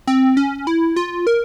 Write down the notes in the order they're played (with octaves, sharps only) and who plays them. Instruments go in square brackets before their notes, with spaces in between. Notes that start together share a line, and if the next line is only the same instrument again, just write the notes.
[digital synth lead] C4
C#4
E4
F4
A#4